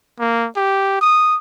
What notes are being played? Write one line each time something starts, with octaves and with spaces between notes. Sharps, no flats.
A#3
G4
D#6